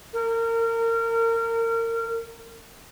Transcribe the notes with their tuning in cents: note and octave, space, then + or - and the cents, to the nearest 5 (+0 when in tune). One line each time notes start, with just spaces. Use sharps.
A#4 -30